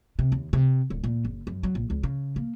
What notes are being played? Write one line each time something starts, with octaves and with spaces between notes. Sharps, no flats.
C3
D#2
C3
D1
A#2
F#1
F#2
F#3
A#1
C#2
C#3
A#3